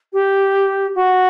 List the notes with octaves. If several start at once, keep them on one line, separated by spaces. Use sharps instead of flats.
G4
F#4